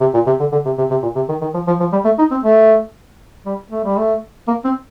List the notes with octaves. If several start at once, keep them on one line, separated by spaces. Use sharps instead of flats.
C3
A#2
C3
D3
D3
C3
C3
C3
A#2
C3
D#3
D#3
F3
F3
F3
G3
A3
D#4
C4
A3
G3
A3
G3
A3
A#3
C4